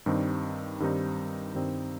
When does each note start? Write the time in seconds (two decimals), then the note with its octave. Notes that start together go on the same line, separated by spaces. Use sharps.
0.06 G2 D#3 G3 C4 D#4
0.80 G2 D#3 G3 C4 D#4
1.54 G2 D#3 G3 C4 D#4